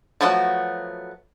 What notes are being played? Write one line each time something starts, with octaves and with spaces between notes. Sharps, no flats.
F3 F#3 A3 B3 F#4